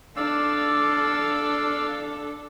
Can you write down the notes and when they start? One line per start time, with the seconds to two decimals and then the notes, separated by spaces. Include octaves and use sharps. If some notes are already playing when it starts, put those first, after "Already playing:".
0.17 D4 A4 D5 F5 E6